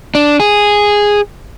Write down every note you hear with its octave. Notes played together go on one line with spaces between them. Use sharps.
D4
G#4